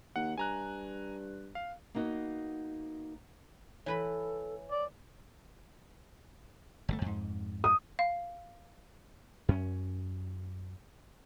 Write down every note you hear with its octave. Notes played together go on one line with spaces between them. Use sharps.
D#2 F#5
G2 G#5 A#5 F#6
F5
A#3 B3 D#4 F#4
E3 A4 B4 C#5 B5
D5
G1 C#3 A3
F2 G#2
D#6
F5
F#2 C#4